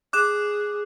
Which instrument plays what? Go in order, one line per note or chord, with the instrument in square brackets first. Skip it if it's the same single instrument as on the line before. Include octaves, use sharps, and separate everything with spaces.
[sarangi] G#4 [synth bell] D6 F#6 E7